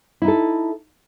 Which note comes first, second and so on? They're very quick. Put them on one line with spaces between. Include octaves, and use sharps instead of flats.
E4 D#4 A4